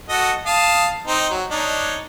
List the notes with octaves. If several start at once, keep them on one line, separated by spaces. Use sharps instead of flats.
F#4 A4 D#5
F5 A5 D#6
C4 D#4 C5
F#3
D4 D#4 C#5